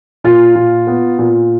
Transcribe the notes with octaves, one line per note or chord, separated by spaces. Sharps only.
A#2 F4
A#2
B3
A#2